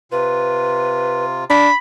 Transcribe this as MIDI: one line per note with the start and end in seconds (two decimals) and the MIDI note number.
0.12 1.44 48
0.12 1.44 65
0.12 1.25 71
1.50 1.69 62
1.50 1.75 83